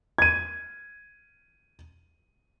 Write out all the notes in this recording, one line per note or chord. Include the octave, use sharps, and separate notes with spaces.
G#6 D#7